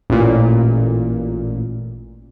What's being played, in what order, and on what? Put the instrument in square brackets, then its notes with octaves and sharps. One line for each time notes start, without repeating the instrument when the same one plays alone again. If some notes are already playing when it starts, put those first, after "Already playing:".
[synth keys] A1 A#2